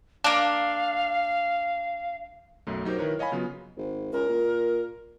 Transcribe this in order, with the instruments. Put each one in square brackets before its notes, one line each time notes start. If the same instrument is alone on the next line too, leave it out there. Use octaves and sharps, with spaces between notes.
[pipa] A#3 D4 [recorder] F5
[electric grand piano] B1 F#2 A3
F#3 D#4 G4 A#4 C5
D#3 E4 A#4 B4 C#5
C#5 D#5 F5 G#5 B5
C#3 F#3 B3 F4
[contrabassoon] G#1
[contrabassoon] C#2 [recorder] A#4
[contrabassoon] A#2